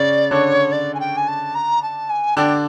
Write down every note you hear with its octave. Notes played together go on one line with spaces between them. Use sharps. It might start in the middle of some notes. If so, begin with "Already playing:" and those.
Already playing: C#3 C#4 D5
D3 D4 C#5
D5
G#5
G5
G#5
A5
A#5
A5
G#5
D3 D4 G5